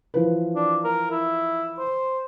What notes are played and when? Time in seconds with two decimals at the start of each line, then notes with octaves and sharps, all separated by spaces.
0.14 E3 F3 B4
0.55 D4
0.84 A#4
1.11 E4
1.78 C5